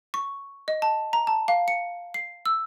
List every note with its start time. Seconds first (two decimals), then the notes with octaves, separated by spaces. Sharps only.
0.14 C#6
0.68 D#5
0.82 A5
1.13 A#5
1.27 A5
1.48 F5
1.68 C#7
2.14 C7
2.46 E6